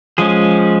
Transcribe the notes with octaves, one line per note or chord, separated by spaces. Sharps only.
F3 G#3 C#4 G#4